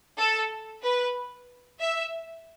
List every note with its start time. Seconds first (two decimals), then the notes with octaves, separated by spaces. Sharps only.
0.18 A4
0.82 B4
1.79 E5